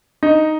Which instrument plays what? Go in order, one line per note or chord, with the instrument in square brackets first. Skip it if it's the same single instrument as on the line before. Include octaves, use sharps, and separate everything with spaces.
[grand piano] D#4